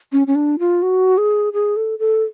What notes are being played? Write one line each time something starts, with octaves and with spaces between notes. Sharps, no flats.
C#4
C#4
D4
F4
F#4
G#4
G#4
A4
A4